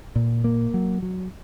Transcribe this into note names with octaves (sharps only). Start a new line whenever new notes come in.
A#2
A#3
F#3
F#3